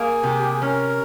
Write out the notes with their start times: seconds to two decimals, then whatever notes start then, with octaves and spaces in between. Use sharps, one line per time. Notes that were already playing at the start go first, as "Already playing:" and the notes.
Already playing: A#3 G#4
0.23 C3
0.39 G4
0.51 G#4
0.61 C#4 A#4